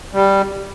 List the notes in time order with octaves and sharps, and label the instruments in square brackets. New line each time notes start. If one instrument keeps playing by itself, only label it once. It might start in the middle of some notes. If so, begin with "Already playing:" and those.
[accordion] G3